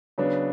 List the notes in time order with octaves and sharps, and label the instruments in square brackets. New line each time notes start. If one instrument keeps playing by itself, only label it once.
[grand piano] C#3 F#3 B3 D4